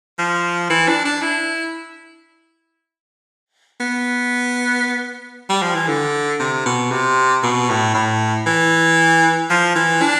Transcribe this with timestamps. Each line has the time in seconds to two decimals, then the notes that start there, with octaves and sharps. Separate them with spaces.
0.19 F3
0.70 E3
0.88 D4
1.05 D4
1.22 E4
3.80 B3
5.49 G3
5.62 F3
5.75 E3
5.88 D3
6.40 C3
6.66 B2
6.91 C3
7.43 B2
7.69 A2
7.94 A2
8.46 E3
9.50 F3
9.76 E3
10.02 D4